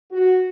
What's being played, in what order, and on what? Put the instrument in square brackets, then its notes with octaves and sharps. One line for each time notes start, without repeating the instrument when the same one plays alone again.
[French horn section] F#4